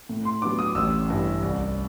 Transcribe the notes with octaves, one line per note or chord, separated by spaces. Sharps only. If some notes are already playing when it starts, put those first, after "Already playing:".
A2
C6
F#3 B3 D4 D6
D#6
A1 E6
G2 E3
C2